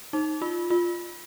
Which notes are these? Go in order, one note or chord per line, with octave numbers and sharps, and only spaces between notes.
D#4
F4
F4